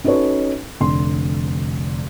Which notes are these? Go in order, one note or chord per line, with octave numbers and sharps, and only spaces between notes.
C#4 D#4 F#4 A4 B4 C#5
F1 D3 C6